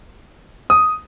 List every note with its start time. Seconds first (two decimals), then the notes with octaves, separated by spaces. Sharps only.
0.70 D#6